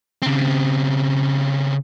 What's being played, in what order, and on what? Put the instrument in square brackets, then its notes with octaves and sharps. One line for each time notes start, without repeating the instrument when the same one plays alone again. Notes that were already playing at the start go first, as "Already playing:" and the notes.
[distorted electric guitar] C#3 C4